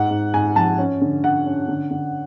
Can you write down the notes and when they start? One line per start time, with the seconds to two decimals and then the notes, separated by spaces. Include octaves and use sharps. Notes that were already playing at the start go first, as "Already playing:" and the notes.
Already playing: G#2 F#5
0.11 G#2
0.34 G#2 G#5
0.56 F3 A5
0.79 C#4
1.01 D3
1.24 D3 F#5
1.46 C#4
1.68 D3
1.91 D3